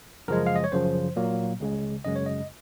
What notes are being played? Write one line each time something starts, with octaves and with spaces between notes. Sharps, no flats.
F#2 C#3 F3 G#3 A#4
F5
D#5
C#5
F#2 C#3 F3 C5
A#2 F#3 A#3
C#2 C#3 G#3
F#2 C#3 G#3 D#5
C#5
D#5